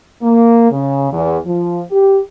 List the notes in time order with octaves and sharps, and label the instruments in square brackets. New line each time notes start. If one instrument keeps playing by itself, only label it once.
[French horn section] A#3
C#3
E2
F3
G4